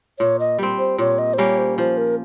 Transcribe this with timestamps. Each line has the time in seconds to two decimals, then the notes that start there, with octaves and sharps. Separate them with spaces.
0.19 A#2 C#5
0.40 D#5
0.58 G3 C4
0.79 C5
0.98 A#2 C#5
1.19 D#5
1.34 C5
1.38 G3 A#3 C#4 C#5
1.58 C5
1.78 F3 C5
1.98 A#4